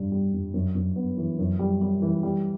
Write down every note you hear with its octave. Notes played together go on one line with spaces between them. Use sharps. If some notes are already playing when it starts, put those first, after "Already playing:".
Already playing: G2 G3
G3
G2
F#2
F#2
B3
E3
F#2
G3
G3
E3
G3